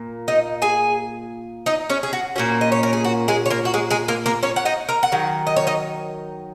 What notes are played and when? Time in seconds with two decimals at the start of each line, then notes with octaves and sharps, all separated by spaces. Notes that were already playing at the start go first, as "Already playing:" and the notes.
Already playing: A#2 A#3
0.28 D#4 D#5
0.62 G#4 G#5
1.66 D#4 D#5
1.90 C#4 C#5
2.03 G#4
2.13 F#4
2.36 A#2 A#3 C#4 F#4
2.61 D#5
2.72 C#5
2.83 A#4
2.93 G#4
3.05 F#4
3.28 G#3 G#4
3.46 C#5
3.50 A#3 A#4
3.65 F#4
3.74 G#3 G#4
3.90 G#3 G#4
4.08 A#3 A#4
4.26 A#3 A#4
4.43 C#4 C#5
4.56 F#5
4.65 D#4 D#5
4.89 A#4 A#5
5.03 F#5
5.12 D#3 F#3
5.47 D#5
5.57 C#5
5.67 D#4 D#5